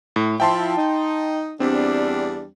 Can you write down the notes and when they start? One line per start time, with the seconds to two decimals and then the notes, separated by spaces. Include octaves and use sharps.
0.16 A2
0.40 F3 E4 G5 A5 C6
0.77 D#4
1.60 E2 G3 C4 D4